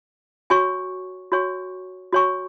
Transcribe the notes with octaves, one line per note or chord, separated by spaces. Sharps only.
F#4 C#5 G#5 C#6
F#4 C#5 G#5 C#6
F#4 C#5 G#5 C#6